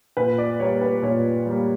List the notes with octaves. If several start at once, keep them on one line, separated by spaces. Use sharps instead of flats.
A#2 B4
D5
G3 A#3 C#5
B4
A#2 C#5
G3 A#3